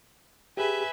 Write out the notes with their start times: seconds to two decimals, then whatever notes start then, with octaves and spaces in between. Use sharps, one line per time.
0.57 G4 G#4 B4 E5 G#5